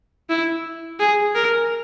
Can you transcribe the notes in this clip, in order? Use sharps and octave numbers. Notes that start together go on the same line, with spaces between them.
E4
G#4
A#4